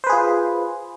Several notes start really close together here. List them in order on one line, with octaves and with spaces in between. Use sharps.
C5 B4 G#4 F4